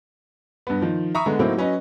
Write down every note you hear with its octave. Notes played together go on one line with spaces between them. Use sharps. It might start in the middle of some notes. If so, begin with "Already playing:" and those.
G2 B3
D#3 F3
E5 A#5 B5 C#6 D#6
D3 G#3 B3
A2 F#3 A#3 C4 D#4 E4
F#3 C#4 B4 D#5